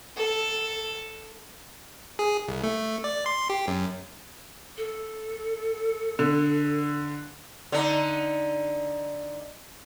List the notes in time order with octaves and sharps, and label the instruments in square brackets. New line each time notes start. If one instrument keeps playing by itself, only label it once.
[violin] A4
[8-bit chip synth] G#4
C2
A3
D5
C6
G4
F#2
[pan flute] A4
[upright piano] D3
[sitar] D3 D#4